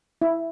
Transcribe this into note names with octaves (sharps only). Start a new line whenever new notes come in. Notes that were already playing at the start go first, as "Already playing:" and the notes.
E4